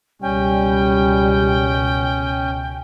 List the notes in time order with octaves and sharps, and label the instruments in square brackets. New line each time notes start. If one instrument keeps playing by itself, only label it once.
[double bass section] C#2 B2 [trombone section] G3 [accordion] C#4 [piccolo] G5